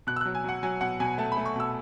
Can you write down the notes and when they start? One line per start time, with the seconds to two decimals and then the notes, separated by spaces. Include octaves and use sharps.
0.07 B2 F#6
0.16 E6
0.21 F#6
0.25 F#3
0.35 G#5
0.44 F#3 F#5
0.63 F#3 G#5
0.81 B2 F#5
1.00 B2 G#5
1.18 A3 A5
1.32 B5
1.37 A3
1.46 C#6
1.56 B2 E6